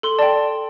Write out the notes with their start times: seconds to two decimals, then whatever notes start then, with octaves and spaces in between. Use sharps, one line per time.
0.03 A4 C6
0.19 D5 G5 A5